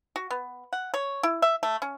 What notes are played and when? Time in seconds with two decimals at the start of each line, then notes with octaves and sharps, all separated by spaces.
0.16 F#4
0.31 B3
0.73 F#5
0.94 C#5
1.23 E4
1.42 E5
1.63 A3
1.82 C#4